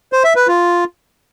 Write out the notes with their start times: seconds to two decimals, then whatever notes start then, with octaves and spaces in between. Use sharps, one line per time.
0.13 C5
0.24 E5
0.36 B4
0.47 F4